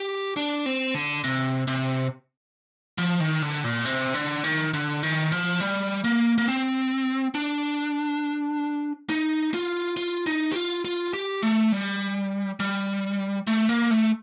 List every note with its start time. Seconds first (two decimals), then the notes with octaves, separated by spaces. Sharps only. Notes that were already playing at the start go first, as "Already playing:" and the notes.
Already playing: G4
0.36 D4
0.66 C4
0.94 D3
1.24 C3
1.67 C3
2.98 F3
3.20 D#3
3.42 D3
3.64 A#2
3.85 C3
4.14 D3
4.44 D#3
4.74 D3
5.03 D#3
5.32 F3
5.60 G3
6.04 A#3
6.38 A#3
6.48 C4
7.35 D4
9.10 D#4
9.54 F4
9.97 F4
10.27 D#4
10.52 G4
10.56 F4
10.85 F4
11.14 G4
11.43 A3
11.72 G3
12.60 G3
13.47 A3
13.69 A#3
13.91 A3